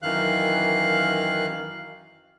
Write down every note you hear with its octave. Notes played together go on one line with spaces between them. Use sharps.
F#2 D#3 E3 F5 F#6